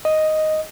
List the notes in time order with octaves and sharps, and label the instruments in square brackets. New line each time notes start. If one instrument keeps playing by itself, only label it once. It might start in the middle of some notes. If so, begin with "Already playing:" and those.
[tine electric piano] D#5